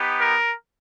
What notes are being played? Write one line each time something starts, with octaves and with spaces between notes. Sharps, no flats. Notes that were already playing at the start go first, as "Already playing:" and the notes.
Already playing: B3 D#4 G4
A#4